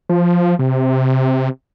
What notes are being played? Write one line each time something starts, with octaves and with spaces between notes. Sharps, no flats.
F3
C3